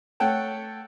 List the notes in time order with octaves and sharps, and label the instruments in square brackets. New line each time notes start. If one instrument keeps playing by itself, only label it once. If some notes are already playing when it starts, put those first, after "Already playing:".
[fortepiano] A3 C#5 F#5 G5 A5